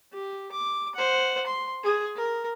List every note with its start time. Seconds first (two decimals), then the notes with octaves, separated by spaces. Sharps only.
0.13 G4
0.52 D6
0.95 C5 F#5
1.47 C6
1.84 G#4
2.15 A#4